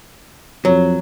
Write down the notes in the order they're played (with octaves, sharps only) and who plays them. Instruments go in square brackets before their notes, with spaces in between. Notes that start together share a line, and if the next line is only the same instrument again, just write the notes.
[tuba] F2 [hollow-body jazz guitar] F#3